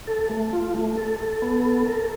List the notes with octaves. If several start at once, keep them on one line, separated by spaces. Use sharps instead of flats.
A4
A3
F4
A3
A4
A4
B3
A4
A#4